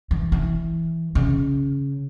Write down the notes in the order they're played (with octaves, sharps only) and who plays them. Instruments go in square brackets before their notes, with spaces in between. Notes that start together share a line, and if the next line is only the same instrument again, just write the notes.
[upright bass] E3
E3
C#3